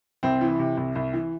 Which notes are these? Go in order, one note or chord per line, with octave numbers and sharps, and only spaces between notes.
C2 C4
E3
C3
C2
C2
E3